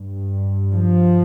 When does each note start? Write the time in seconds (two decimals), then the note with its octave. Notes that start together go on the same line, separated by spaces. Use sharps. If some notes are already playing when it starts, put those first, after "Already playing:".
Already playing: G2
0.74 F3